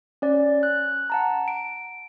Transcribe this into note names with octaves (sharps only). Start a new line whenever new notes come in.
C#4 D5
F#6
F#5 A5 A#5
D7